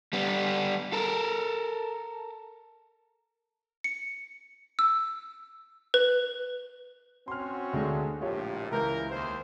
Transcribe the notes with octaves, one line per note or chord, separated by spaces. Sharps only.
G3 B3
A4 A#4
C#7
E6
B4
C4 C#4 F#4 C6 F6
D2 G#3 D4
A#1 A2 F4 G4 C#5
C#2 E3 A#4 G6
D#2 C5